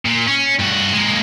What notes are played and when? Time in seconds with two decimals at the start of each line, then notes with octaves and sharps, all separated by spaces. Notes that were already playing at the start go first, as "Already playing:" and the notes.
0.06 A#2
0.27 C#4
0.59 G2 F#4
0.93 G#3 A#3